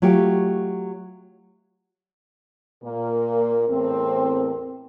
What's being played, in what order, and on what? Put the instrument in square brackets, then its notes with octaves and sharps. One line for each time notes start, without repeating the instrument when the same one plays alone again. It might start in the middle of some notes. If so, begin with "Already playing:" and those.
[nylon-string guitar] F#3 A3 F4 G4
[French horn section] A#2 A#3 [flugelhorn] A#4
[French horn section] E2 A2 C4